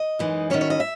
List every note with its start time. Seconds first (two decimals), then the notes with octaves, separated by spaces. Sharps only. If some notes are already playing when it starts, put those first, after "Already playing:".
Already playing: D#5
0.19 F#2 E3 G#3 D#4
0.50 D#3 F#3 C#4 E4 C#5
0.61 C#5
0.70 D#5
0.80 E5